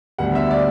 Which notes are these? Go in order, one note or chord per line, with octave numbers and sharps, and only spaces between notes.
D2 D3 G3 B3 F#5
E5
D5